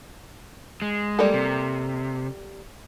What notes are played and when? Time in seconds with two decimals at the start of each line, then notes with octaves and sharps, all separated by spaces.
0.82 G#3
1.19 G3 A#3 A4
1.34 C3